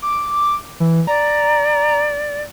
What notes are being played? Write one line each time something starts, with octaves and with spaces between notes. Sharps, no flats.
D6
E3
D5 A#5